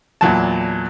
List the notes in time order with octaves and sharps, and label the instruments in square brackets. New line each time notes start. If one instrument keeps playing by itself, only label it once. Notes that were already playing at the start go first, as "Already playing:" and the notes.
[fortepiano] E2 A#2 F#3 A5